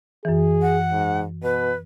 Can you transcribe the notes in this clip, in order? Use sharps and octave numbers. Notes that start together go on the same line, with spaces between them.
F#2 E3 G#4
F#5
G#2
B2 B4